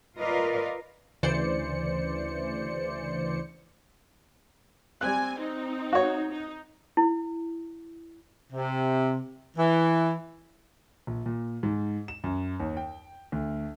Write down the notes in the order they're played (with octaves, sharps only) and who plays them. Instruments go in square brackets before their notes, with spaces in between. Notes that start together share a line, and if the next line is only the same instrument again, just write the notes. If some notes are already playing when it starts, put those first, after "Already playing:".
[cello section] F4 A#4 B4 D5 D#5 F5
[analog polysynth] D2 C#3 E3 C5 D5 C#7
[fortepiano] G3 F#6 [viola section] C4 G#5
[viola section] C4 D#4
[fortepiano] F#4 C#5
[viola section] D#4
[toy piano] E4
[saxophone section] C3
E3
[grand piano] A#1
A#2
G#2
E7
F#2
D#2
G5
D2